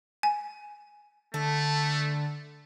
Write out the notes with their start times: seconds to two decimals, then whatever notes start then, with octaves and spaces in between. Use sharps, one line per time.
0.23 G#5
1.34 D3 A3 A4